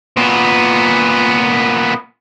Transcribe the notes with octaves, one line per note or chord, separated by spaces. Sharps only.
A#2 B3